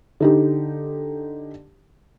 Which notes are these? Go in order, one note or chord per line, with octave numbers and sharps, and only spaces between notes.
D3 D#4 G4